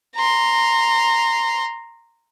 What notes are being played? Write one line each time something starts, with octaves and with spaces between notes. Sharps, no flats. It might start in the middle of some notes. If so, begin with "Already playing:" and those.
A#5 C6